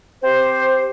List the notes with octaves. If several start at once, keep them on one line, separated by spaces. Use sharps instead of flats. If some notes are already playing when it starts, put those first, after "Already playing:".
C4 G4 C5